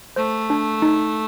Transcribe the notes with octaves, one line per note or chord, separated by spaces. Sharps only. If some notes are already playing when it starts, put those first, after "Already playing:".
A3 C5
D4
D#4